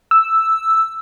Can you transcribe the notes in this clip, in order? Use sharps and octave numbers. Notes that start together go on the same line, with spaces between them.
E6